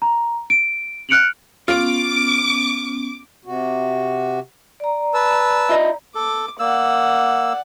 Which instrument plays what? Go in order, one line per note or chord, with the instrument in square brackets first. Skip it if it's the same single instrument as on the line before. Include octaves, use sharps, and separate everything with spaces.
[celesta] A#5
D7
F6 F#6 C#7 D7 F7 F#7
[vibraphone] B3 C#4 [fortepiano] F4 [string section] D6
[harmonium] C3 F#4
[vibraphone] D5 A#5
[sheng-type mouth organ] B4 A5 E6
[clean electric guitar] E4 F4 D#5
[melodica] A4 [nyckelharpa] D6
[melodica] A#3 E6 [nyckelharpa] D5 F#5